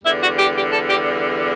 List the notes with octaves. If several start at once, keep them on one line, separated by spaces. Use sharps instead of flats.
E2 D3 G3 E4
F#4
G4
G4
A4
G4